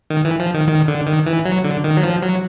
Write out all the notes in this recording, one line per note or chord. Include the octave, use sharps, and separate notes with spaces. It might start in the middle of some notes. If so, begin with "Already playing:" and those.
D#3
E3
F3
D#3
D#3
D3
D#3
E3
F#3
D3
D#3
F#3
F3
F#3